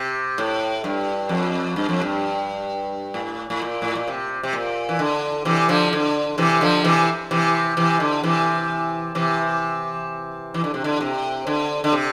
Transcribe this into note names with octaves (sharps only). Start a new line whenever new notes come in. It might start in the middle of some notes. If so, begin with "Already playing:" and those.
Already playing: C3
A2
G2
F2
G2
F2
G2
A2
A2
A#2
A2
A#2
C3
C3
A#2
E3
D3
C3 E3
D3 F3
D3
C3 E3
D3 F3
C3 E3
C3 E3
C3 E3
D3
C3 E3
C3 E3
E3
D3
C3
D3
C3
D3
D3
C3